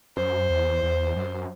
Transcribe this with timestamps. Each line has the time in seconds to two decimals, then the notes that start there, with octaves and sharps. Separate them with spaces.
0.17 F#2 C5
0.50 E2
0.83 E2
1.16 F#2